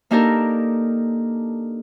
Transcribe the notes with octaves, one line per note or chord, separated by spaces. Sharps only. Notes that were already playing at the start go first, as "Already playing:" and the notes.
A#3 D4 D#4 G4 A4 A#4